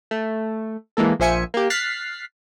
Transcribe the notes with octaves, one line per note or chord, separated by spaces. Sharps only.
A3
E3 G#3 A#3 A4
A#1 F3 C5 E5 G#5 C#7
A#3 G4
F6 F#6 A6 B6 C7